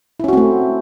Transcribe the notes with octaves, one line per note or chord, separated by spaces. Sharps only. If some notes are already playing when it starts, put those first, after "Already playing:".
A3 C4 C#4 E4 F#4